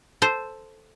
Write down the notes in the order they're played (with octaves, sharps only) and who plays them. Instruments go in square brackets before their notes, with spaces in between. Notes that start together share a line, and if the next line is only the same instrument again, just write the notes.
[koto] A4 C5